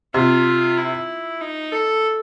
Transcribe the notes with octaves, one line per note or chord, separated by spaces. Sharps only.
C3 F4
E4
D#4
A4